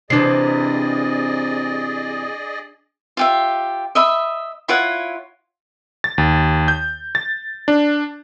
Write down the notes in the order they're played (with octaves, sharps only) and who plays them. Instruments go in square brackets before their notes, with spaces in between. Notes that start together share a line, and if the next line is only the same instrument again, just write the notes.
[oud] C3 E3 [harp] D4 C7 [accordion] G#4 D5 D#5
[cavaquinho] F4 G4 E5
D#5 E5 B5
E4 F4 C#5 F#5
[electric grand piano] A6
D#2
G6
A6
D4